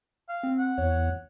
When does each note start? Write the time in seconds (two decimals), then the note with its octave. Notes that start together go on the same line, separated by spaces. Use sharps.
0.29 F5
0.43 C4
0.58 F#5
0.78 E2 C#5